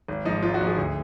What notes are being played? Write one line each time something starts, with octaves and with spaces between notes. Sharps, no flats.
G#1
G#2 F3 D#4
G#1 F4
F#4
G#2 F3
G#4
D2